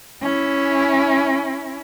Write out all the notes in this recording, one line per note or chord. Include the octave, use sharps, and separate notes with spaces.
C#4 E4